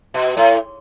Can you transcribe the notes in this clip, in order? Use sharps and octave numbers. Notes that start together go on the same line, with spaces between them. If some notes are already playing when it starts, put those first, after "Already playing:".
B2
A2